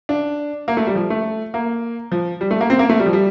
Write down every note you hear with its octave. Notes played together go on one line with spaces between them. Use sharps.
D4
A#3
A3
G3
F3
A3
A#3
F3
G3
A3
A#3
C4
A#3
A3
G3
F3
G3